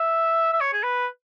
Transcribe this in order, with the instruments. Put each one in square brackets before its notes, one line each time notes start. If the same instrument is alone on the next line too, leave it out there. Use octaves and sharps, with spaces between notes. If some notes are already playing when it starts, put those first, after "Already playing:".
Already playing: [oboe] E5
E5
C#5
G#4
B4